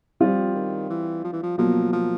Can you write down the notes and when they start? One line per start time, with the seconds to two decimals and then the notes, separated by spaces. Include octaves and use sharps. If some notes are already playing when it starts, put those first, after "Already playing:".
0.21 F3 G3 C4 F4
0.55 D#3
0.89 E3
1.24 F3
1.33 E3
1.43 F3
1.58 B2 F3 F#3 A#3
1.92 F3